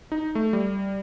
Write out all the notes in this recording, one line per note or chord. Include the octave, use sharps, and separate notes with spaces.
D#4
A3
G3